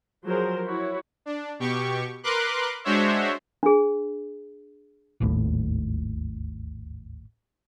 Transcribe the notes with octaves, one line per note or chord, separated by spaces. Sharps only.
F3 F#3 G#4 A#4 C5
E4 F#4 C#5
D4
B2 G4 C#6
A#4 B4 C6 D6 F#6
G#3 D4 F#4 C5 C#5 E5
D4 G#4
D1 G#1 D#2 A2